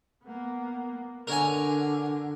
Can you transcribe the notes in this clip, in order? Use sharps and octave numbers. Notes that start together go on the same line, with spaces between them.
A#3 B3
D3 A#4 C#5 G#5